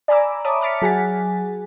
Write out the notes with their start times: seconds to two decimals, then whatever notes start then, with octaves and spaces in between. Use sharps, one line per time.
0.08 D5 G#5 A#5 B5 D6 E6
0.45 C#5 E5 A5 B5 D6 D#6
0.61 D6 F6 A6 B6 C#7
0.82 F#3 G#4 F#5 G#5 A6 B6